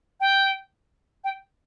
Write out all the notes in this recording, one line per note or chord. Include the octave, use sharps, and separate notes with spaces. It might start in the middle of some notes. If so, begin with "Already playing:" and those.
G5
G5